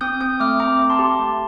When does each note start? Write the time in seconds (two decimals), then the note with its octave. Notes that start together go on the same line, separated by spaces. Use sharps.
0.01 C4 D#6 G6
0.21 C4 D#6 G6
0.40 A3 D6 F6
0.59 C4 A#5 D6
0.79 A3
0.90 A5 C6
0.99 G4
1.20 A3